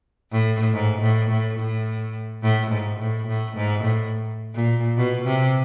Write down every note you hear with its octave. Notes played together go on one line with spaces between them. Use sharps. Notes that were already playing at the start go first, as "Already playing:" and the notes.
A2
G#2
A2
A2
A2
A2
G#2
A2
A2
G#2
A2
A#2
B2
C3